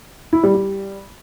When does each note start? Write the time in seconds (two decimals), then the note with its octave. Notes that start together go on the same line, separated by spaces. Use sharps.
0.33 E4
0.44 G3
0.54 G3